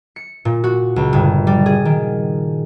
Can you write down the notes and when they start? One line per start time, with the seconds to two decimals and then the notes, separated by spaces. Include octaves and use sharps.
0.16 C#7
0.45 A#2
0.64 F#4
0.96 C#2
1.13 G1
1.47 G3
1.66 G#4
1.85 D#3